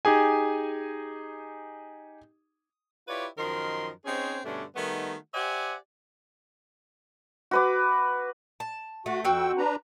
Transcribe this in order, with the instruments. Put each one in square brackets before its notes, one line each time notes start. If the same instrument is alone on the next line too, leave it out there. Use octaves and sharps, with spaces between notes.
[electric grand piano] D#4 G4 G#4 G#5
[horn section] E4 F4 G4 B4 C#5 D5
F#2 D#3 F3 A#4 D#5 C6
C4 C#4 D#4 G#4 C5 C#5
G2 B2 D3 A3 C#4 D4
D#3 G3 A3 B3 D#4 F#4
G4 C5 D5 E5 F#5 G#5
[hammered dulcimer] F#4 B4 D6
[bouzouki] A5
[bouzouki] A3 [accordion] F#4
[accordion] F2 G5 E6 [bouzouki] C4 F#4
[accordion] D4 B4 A#5